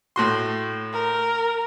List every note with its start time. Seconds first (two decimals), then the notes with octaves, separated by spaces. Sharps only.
0.16 A2 F#4 C6
0.93 A#4